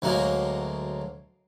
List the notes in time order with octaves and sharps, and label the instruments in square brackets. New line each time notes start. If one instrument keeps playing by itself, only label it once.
[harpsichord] D2 F#3 G#3 A#3